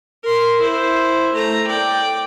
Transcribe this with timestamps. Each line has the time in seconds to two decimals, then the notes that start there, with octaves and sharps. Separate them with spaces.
0.23 A#4 C6
0.60 E4 C5
1.33 A3 A#5
1.67 D5 G5